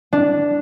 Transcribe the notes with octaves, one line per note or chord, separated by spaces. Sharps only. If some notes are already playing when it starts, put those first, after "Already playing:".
D4